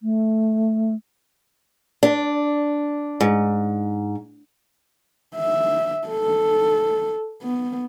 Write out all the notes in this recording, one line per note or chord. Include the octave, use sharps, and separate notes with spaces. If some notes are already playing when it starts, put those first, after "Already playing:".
A3
D4
G#2
E5
A4
B3